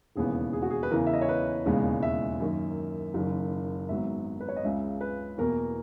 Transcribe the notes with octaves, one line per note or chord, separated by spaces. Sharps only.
E1 D#2 C#3 E3 B3 G#4
G#4
F#4
G#4
B4
E2 C#3 E3 A#4
E5
D#5
C#5
B4
E1 D#2 C#3 G#3 B3
E5
F#2 D#3 A#3
F#1 F#2 D#3
G#1 G#2 F#3 B3 E5
B4
C#5
D#5
C#2 C#3 G#3 E5
B4
E2 B2 A#3 A#4